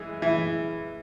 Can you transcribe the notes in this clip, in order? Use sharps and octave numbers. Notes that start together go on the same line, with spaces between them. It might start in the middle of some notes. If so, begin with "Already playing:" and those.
Already playing: E3 G#3
E3